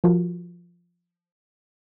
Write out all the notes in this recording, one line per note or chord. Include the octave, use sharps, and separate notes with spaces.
F3 F4 F#4 A#4